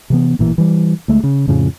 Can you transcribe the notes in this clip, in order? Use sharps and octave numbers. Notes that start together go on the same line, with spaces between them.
C3 E3 B3
A1 A#2 E3
E3 G3
D2 G#3 A3
C#3
F2 A2 C#3 F3